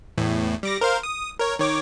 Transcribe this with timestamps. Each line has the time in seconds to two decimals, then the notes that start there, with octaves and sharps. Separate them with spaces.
0.18 E2 A2
0.63 G3 D6 A#6
0.81 A#4 C5 F5
1.03 D#6
1.40 A#4 C#5
1.59 D#3 C#5 D6